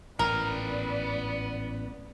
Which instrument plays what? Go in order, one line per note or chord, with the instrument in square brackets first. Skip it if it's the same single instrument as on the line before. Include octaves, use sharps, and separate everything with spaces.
[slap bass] A1 G#2 [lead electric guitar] B3 G5 [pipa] A#4 [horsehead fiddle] B4 D5